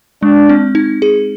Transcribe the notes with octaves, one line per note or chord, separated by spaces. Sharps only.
G#3 D4
C4
D#4
G#4